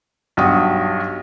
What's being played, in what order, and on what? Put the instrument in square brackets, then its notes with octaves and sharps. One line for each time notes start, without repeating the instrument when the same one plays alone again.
[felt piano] B1 G2 F#4 G5 D#6